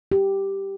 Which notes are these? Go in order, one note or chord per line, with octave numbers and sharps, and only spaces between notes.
G4